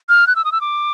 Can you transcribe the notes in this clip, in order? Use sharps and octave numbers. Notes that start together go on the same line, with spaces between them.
F6
F#6
E6
D#6
E6
D6